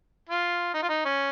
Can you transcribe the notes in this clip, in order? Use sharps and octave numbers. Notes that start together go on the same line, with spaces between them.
F4
D#4
F4
D#4
C#4